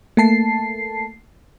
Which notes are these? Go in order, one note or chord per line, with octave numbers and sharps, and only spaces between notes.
A3 A#3 A5 C7